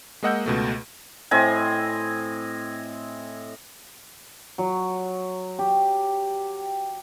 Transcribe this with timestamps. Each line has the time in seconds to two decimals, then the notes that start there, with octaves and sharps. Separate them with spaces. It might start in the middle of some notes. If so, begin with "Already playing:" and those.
0.23 G#3 A#3 D#5 F#5 E6 G6
0.46 C#2 B2 A3
1.31 A2 C4 D#5 G#5
4.58 F#3
5.59 G4